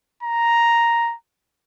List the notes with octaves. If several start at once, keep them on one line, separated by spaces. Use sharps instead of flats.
A#5